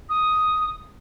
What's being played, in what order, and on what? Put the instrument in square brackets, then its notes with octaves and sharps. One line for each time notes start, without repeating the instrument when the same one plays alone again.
[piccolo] D#6